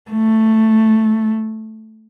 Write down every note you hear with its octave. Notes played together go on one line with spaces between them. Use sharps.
A3